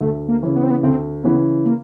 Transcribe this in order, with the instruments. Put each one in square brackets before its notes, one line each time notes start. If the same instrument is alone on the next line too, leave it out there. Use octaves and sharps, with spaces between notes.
[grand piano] D2 [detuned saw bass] A3
[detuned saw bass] A#3
[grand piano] C#3 E3
[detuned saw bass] B3
C4
B3
[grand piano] D2 [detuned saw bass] C4
[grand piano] C#3 E3 [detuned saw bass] B3
[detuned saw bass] A#3